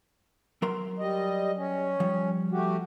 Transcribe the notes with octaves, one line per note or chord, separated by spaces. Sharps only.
F#3 A#4 C6
G3 D#5
C#4
F3 G3
A3 F#4 G4